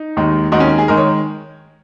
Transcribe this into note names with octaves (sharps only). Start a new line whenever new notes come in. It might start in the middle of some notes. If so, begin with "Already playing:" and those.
Already playing: D#4
D#2 D#3 G#3
D#2 D#3 G#3 F#4
C#4
G#4
D#3 G#3 A#4
C#5